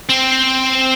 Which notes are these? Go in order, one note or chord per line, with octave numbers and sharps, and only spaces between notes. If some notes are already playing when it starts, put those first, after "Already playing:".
C4